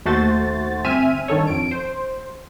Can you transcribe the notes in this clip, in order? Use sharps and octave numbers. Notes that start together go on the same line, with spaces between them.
D#2 A3 F#4 C5 A6
G1 C4 E5 G#5 F6 D#7
G2 D#3 A4 C#5
F2 D7
C5